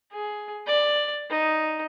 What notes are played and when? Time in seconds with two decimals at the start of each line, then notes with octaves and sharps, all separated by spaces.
0.13 G#4
0.67 D5
1.30 D#4